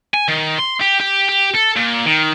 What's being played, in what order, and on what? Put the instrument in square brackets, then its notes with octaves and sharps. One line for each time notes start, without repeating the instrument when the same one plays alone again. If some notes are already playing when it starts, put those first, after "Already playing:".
[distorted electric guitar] G#5
D#3
C6
G4
G4
G4
A4
A#2
D#3